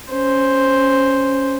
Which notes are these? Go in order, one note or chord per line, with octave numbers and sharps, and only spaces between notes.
C#4 C5